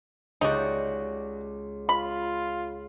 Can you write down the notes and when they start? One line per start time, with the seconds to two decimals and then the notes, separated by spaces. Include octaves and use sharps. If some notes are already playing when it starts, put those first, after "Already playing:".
0.41 C#2 D#4 F#4 G4 D5
1.89 F4 B5